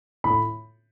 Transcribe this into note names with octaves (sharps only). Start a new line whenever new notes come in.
A2 B5